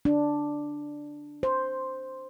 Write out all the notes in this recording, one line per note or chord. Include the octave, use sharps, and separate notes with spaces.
D4
C5